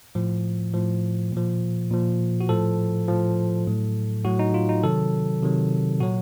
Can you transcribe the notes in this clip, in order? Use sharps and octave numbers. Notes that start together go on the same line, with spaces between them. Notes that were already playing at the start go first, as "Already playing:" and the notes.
A2 F3
A2 F3
A#2 F3
A#2 F3
F#4
A2 F3 A4
A2 F3
A2 F#3
A2 F#3 F#4
D#4
F4
D#4
C3 D#3 F#3 A4
C3 D#3 F#3
A#2 F#3 F#4